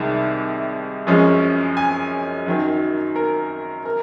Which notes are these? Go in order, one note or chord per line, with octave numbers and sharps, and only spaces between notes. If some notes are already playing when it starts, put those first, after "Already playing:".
Already playing: C2 C3 D#3 G#3
F#2 F3 G#3 C#4
G#5
F#2 D#3 F#3
A#4
A#4